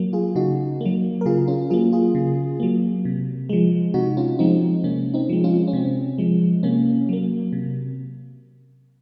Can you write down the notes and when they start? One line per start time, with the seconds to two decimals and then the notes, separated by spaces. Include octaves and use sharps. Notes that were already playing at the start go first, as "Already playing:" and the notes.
Already playing: F#3 A#3
0.13 F4 G#4
0.35 C#3 D#4 F#4
0.81 F#3 A#3
1.21 A#4
1.26 C#3 F4 G#4
1.47 C#4 F4
1.70 F#3 A#3 F4 G#4
1.92 F4 G#4
2.15 C#3
2.60 F#3 A#3
3.05 C3
3.49 F3 G#3
3.94 C3 D#4 F#4
4.17 C#4 F4
4.39 F3 G#3 C4 D#4
4.84 C3 A#3 C#4
5.14 C4 D#4
5.29 F3 G#3
5.44 C#4 F4
5.68 C#4
5.73 C3 C4
6.18 F3 G#3
6.63 C3 A#3 C#4
7.09 F#3 A#3
7.53 C3